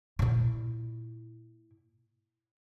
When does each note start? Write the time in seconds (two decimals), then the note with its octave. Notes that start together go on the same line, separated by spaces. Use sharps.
0.19 A#2 E4